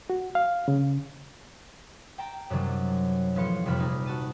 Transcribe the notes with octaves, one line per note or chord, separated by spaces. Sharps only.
F#4
F5
C#3
G5 A5 A#5
F#2 C3 D#3 F#3 G3
A1 F3 B3 F5 C6 C#7
D#1 F2 C3 G3 B5 F6
G3 G#3 D#4
F#4 A5 D#7